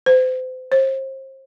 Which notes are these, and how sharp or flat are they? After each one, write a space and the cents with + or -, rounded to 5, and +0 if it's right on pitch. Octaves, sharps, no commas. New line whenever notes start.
C5 -35
C5 +35